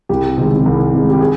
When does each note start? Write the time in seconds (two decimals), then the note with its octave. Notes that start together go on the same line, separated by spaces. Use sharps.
0.09 C2 G4
0.37 C3 D#3 G#3
0.65 C2
0.92 C3 D#3 G#3
1.10 G4
1.21 G#4